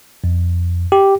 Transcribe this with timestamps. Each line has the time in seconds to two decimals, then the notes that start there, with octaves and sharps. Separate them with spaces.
0.24 F2
0.92 G4